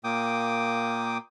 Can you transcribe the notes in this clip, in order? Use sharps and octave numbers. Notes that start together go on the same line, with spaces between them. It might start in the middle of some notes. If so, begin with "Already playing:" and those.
A#2 A#3 G5 D6 D#6